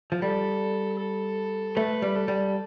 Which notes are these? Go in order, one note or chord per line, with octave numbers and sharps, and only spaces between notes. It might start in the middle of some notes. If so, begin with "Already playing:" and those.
F3
G3 A4
A4
A3 B4
G3
A4
G3